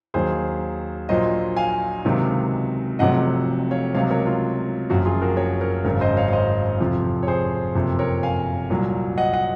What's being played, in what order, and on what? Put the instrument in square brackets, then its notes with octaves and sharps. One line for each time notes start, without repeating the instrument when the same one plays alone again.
[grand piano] D#2 D#3 F#3 G#4 C5
A#1 A#2 F#3 C5 D#5
F5 G#5
C#2 C3 D#3 F#3
F1 F2 C3 F#3 D#5 F#5
C#5 F5
C#2 C3 F#3 C#5 F5
A#4 C#5
F4
F#1 F#2 F3 F#4
F4 G#4
F#4 A#4
A#4 C#5
A#4 C#5
G#1 F#2 C#3 A#4 C#5
C5 D#5
C#5 F5
F5
C5 D#5
F2 C3 F3
C#5
G#4 C5
F#1 F2 C3
A#4 C#5
F5 G#5
C2 A#2 F#3
D#5 F#5
D#5 F#5